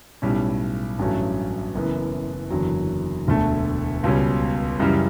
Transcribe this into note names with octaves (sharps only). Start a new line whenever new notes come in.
B1 A2 G3 C#4
A1 G2 F#3 A3 C#4
F#1 F#2 E3 B3
F#1 E2 D3 F#3
E1 D2 D3 A3
C#2 B2 G3 C#4
F#2 C#3 E3 G3